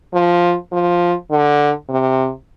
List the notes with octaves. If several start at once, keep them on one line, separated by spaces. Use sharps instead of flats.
F3
F3
D3
C3